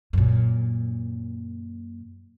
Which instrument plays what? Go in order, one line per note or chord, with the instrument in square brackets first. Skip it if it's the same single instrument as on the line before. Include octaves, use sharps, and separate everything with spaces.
[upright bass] F#2 A#2